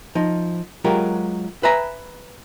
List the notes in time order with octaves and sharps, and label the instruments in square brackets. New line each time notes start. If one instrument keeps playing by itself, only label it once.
[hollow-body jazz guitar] F3 D#4
F#3 G#3 F4 G4 A#4
B4 E5 G#5 A#5 B5